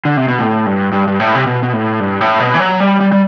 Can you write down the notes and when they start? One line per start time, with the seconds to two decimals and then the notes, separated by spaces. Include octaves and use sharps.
0.05 D3
0.17 C3
0.28 B2
0.39 A2
0.66 G2
0.92 G2
1.08 G2
1.20 A2
1.35 C3
1.46 B2
1.63 B2
1.73 A2
2.00 G2
2.21 A2
2.40 B2
2.54 E3
2.60 F#3
2.80 G3
3.00 G3
3.12 G3